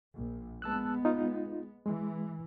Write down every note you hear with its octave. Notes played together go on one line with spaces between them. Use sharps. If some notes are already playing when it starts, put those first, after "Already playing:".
A#1
G#3 B3 A5 E6 F#6
D#4 F4
E3 G#3